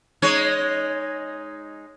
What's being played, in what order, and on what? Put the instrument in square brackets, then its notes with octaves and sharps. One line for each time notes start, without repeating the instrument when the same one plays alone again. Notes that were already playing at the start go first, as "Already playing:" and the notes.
[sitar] G#3 D#4 C#5